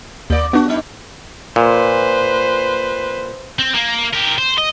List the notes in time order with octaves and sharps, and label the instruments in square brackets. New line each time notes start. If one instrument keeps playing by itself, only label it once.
[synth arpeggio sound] D#2 [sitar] A#3 D5
[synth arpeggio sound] B3 D4 [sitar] F#4
[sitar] G2 D#4
[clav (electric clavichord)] A#2 [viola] B4 C5
[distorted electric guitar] C4
A#3
G4 A#4
C5
D#5